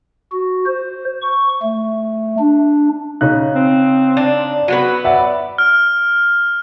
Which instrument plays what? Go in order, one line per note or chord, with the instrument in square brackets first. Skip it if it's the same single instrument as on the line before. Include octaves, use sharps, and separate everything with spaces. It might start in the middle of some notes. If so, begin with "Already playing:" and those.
[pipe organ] F#4
C5
C#6
A3
D4
[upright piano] C#3 D#4 F#6
[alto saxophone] C4
[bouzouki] D4
[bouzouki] F#3 B3 B4 [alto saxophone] F#4
[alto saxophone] D5 [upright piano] E5 F#5
[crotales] F6